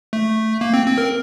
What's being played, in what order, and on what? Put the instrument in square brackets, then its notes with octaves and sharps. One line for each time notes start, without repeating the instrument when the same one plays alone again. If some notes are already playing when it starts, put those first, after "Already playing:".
[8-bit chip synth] A3
A#3
C4
C4
A#4